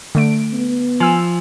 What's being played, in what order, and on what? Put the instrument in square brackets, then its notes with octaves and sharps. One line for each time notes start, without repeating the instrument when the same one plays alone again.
[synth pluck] D3 A3 D7
[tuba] B3
[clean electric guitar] F3 [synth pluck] G#5 E6